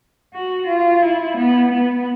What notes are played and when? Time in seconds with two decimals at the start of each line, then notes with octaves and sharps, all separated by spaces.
0.34 F#4
0.67 F4
1.02 E4
1.38 B3
1.73 B3